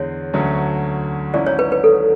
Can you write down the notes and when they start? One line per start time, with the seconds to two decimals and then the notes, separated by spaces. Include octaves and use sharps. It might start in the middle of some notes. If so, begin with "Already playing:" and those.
Already playing: E2 D3 G#3 C#5
0.34 D2 D3 F#3 A3 C#4
1.34 G#1 G#2 F#3 C#4 E4 D5
1.46 C#5
1.59 B4
1.72 B4
1.84 A4